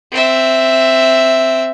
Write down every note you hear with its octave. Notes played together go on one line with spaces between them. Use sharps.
C4 E5